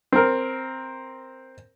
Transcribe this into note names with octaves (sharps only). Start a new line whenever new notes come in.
C4 A#4